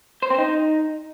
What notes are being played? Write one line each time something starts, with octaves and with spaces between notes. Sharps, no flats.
C5
C4
D#4